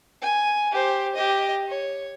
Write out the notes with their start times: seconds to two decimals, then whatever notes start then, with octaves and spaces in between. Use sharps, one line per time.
0.21 G#5
0.71 G4 C5
1.15 G4 D#5
1.68 C#5